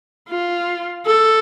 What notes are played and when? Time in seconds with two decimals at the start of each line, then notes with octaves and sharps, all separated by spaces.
0.29 F4
1.06 A4